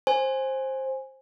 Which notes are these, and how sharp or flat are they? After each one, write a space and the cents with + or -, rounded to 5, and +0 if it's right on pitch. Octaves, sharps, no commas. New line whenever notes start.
C5 +15 G#5 -5